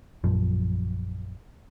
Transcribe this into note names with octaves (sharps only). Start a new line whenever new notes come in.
A#1 F#2 F3